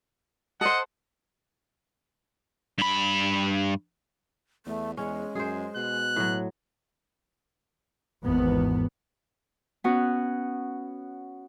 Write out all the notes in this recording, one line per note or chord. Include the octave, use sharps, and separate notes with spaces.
A4 C5 D#5 F#5
G2 B5
E2 A3
E2 G#3 C#4
F#2 G#4 C5
B2 F#6
A2 F#3
G#1 E2 B3
B3 C#4 F#4